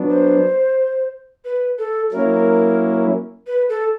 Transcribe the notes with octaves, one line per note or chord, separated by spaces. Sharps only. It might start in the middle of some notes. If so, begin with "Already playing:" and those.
Already playing: F#3 B3 D4
C5
B4
A4
F#3 A#3 C#4 E4 A#4
B4
A4